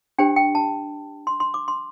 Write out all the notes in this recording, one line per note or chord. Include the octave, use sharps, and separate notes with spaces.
D4 G4 C5 G5
G5
A5
C6
C6
D6
C6